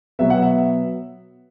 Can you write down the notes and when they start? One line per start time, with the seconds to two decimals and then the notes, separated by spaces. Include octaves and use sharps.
0.19 B2 F#3 B3 E5
0.30 F#5
0.42 E5